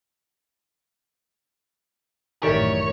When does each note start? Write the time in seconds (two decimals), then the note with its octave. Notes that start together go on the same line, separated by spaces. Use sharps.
2.43 A1 F#2 A2 D#3 G4 C#5 D5 E5